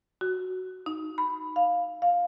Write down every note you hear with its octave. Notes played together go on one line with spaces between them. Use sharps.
F#4
D#4
B5
F5
F5